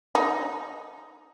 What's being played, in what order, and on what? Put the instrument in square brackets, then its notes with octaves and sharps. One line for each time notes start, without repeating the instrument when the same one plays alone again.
[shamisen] D#4